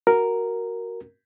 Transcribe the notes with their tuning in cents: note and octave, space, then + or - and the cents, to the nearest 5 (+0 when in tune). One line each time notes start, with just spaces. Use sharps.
F#4 +0 A#4 +0